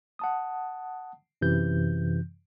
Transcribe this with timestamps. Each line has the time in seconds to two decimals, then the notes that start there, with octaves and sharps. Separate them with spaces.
0.19 F#5 A5 D#6
1.41 F#2 C3 E3 G6